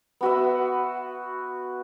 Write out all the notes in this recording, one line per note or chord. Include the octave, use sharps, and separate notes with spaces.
B3 F#4 B4 E5